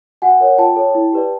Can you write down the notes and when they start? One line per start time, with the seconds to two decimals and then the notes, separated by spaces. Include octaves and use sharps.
0.22 F#4 F#5 G#5
0.40 A#4 C#5
0.58 F4 G5 A5
0.76 A4 C#5
0.95 E4
1.12 G4 B4 D5